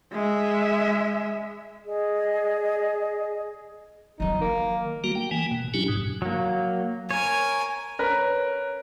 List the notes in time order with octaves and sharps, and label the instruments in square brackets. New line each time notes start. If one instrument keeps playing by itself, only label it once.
[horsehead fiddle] G#3 E5
[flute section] G#4 D5 D#5
[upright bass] D#3 F#3 [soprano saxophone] D#4
[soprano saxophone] A#3
[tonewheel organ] G3 A#3 F#4
G5
E3 A#3 G#5
B2
F#3 C#4 D4 E4 G4
G#2 B2
[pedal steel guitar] F#3 A#3
[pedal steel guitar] A#4 C#5 [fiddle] G#5
[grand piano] C#4 A#4 B4